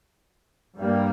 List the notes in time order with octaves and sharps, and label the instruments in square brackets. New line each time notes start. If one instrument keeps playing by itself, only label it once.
[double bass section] G2 G3 A#3